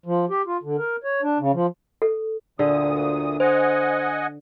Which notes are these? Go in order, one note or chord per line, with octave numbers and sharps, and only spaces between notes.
F3
G4
F4
D3
A#4
C#5
D4
C#3
F3
A4
D2 A#2 D3 G#4 D#6
C5 D#5 F#5 G#5